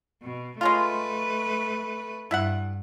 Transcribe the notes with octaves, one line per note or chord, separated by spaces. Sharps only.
B2
G#3 A3 C#4 F4 B4
G2 E4 E5 F#5